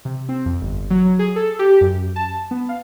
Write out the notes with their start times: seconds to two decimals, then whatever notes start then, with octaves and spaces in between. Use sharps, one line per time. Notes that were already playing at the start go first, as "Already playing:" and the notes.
0.05 C3
0.29 C4
0.46 F2
0.61 G1
0.90 F#3
1.19 G#4
1.36 A4
1.59 G4
1.81 F#2
2.16 A5
2.51 B3
2.69 F5